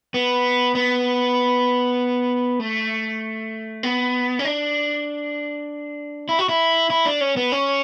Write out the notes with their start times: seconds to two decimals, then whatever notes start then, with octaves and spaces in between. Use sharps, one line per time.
0.14 B3
0.75 B3
2.60 A3
3.83 B3
4.39 C#4
4.45 D4
6.29 E4
6.39 F#4
6.49 E4
6.90 E4
7.06 D4
7.21 C#4
7.37 B3
7.52 C#4